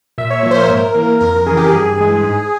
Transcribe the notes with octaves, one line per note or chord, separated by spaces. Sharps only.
A#2 E5
C#5
F3 A#3
C5
A#4
G#2
E3 A#3
F2 A#4
C#3 E3 G#4
G4
G2 G#4
E3 G#3
G#2